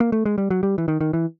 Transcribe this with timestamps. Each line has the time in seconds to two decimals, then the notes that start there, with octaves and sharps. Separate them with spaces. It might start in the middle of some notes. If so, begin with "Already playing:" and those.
0.00 A#3
0.12 A3
0.25 G#3
0.38 G3
0.50 F#3
0.63 G3
0.78 E3
0.88 D#3
1.01 D#3
1.13 E3